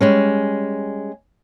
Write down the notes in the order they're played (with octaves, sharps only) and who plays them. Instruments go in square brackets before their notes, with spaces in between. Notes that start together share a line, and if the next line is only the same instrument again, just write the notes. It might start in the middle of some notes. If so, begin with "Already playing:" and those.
[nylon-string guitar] G3 G#3 C#4